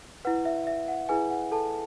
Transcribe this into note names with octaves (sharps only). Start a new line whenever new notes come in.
E4 B4 F#5
E5
E5
F#5
E4 G#4 B4 G#5
F#5
A4 A5